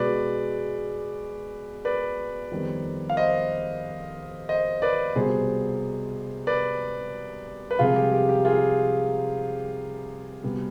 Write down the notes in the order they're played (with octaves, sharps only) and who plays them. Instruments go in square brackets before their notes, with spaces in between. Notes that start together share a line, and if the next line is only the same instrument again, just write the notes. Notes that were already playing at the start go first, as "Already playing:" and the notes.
Already playing: [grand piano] B2 G#3 B3 B4 D5
B4 D5
F2 D#3 G3 B3
F5
C5 D#5
C5 D#5
B4 D5
C2 B2 G3 B3 G#4 C5
B4 D5
B4
C2 C3 F3 G#3 F4 G#4
G4
G4
G4
F4 G#4
C2 B2 G3 B3